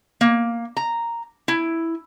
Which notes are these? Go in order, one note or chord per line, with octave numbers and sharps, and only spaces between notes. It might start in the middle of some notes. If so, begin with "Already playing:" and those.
A#3
A#5
E4